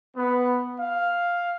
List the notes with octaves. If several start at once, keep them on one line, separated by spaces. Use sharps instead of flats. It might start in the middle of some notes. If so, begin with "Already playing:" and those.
B3
F5